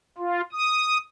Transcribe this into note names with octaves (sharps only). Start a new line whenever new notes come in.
F4
D#6